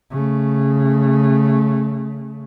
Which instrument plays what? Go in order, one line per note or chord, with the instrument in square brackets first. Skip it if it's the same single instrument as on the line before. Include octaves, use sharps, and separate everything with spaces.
[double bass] C#3 A3